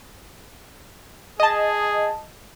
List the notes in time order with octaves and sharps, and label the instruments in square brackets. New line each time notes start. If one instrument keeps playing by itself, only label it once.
[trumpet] G#4 [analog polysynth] D#5 A5